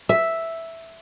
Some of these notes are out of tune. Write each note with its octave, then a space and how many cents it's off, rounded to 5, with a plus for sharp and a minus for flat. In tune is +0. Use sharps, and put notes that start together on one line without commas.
E5 +0